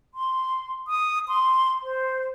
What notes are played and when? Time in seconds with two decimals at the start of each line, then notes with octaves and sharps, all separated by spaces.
0.15 C6
0.88 D#6
1.28 C6
1.83 C5